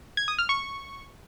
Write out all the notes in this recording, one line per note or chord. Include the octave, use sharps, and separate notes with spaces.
G#6
D#6
F6
C#6